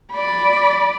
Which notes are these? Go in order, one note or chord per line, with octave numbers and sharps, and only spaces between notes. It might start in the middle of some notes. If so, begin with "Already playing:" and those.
D5 B5